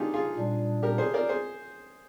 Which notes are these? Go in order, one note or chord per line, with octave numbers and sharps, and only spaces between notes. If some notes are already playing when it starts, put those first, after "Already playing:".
Already playing: D4 D#4 F4 G4 G#4
F4 G#4
A#2 G3 D4
G4 A#4
G#4 C5
A#4 D5
G#4 C5